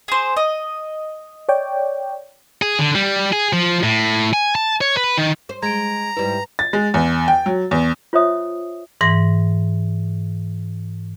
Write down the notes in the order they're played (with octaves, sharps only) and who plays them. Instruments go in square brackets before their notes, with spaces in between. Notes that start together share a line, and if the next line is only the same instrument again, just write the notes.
[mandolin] G#4 C5
D#5
[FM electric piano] C#5 D5 G5
[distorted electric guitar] G#4
D3
G3
G#4
F3
A2
G#5
A5
C#5
B4
D#3
[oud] C5
[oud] G#3 [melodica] A#5 [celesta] G#6 D7
[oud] G#2 G3 E4 [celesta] B4
[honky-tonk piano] A6
G#3
E2
G5
F#3
E2
[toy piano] F4 C5 C#5 E5 D#6
[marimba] G#2 E3 A#6